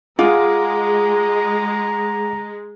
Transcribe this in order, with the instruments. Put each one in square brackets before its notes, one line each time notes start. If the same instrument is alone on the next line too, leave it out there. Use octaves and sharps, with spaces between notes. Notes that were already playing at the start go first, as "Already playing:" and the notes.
[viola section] G#3 [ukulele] F4 [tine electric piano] G#4 F#5 D6 [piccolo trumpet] A#5